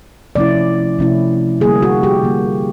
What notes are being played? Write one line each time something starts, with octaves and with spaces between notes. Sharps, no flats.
C3 F3 A3 C#4 E4 D5
C3 F3 A3 C#4 E4
D3 G3 A#3 G#4
F#4
G4
D3 G3 A#3